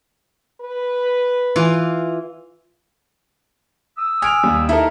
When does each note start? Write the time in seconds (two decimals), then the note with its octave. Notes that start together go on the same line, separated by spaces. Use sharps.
0.61 B4
1.56 E3 F4
3.98 D#6 E6
4.22 G#5 F6 D7 F7
4.43 D#2 G3
4.69 D#4 E4 A4 A#4